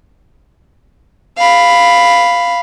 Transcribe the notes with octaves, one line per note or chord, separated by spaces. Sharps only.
F5 B5